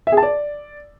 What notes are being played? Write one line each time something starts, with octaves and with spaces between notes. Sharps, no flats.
E5
G#4
A5
D5